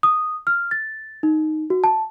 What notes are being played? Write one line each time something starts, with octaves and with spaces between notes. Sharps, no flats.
D#6
F6
A6
D#4
F#4
A5